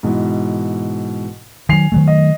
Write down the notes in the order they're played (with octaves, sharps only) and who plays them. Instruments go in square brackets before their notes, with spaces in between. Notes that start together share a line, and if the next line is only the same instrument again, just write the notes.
[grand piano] G#2 B2 E3
[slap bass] D#3 F#3 [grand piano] G#5 C7 F7
[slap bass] D#3 F#3 A3
[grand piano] D#5